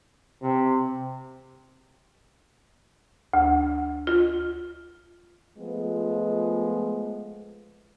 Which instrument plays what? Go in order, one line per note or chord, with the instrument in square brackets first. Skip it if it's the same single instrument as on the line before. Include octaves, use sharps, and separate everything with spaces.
[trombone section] C3
[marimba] D2
F4
[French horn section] F3 G#3 A3 B3 F4